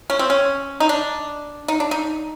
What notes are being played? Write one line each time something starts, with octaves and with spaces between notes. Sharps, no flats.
C#4
C4
C#4
D#4
D4
D#4
D4
D#4